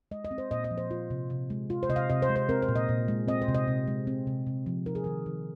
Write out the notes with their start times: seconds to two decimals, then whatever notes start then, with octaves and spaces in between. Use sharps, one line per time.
0.11 G#3 D#5
0.25 D#5
0.31 C4
0.38 C5
0.51 A#2 D#5
0.64 D#5
0.71 F3
0.78 C5
0.91 F4
1.10 C3
1.30 C3
1.50 G#3
1.70 F4
1.83 C5
1.89 C3 D#5
1.96 F5
2.09 C3 D#5
2.22 C5
2.29 G#3
2.36 C5
2.49 C4 A#4
2.62 C5
2.68 A#2
2.76 D#5
2.89 A#2
3.08 G#3
3.28 C4 D#5
3.42 C5
3.48 C3
3.55 D#5
3.68 C3
3.88 G#3
4.07 C4
4.27 C3
4.47 C3
4.66 F3
4.86 D#4 A#4
4.95 G#4
5.04 D#3 A#4
5.26 D#3